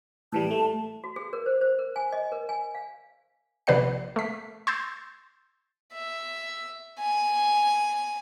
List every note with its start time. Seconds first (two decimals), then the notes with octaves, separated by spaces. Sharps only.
0.32 A2 E3 G3 A5
0.51 A3
1.04 F#4
1.16 G#4
1.33 A#4
1.46 C5
1.61 C5
1.79 A#4
1.96 G#5
2.12 D#5
2.32 A#4
2.49 G#5
2.75 F5
3.67 A#1 C3 B4 D5 F#5 C7
4.16 A3 B6
4.67 C6 E6 G6 A6 C7
5.93 E5
7.00 G#5